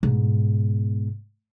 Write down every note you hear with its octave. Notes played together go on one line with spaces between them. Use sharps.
G#2 B2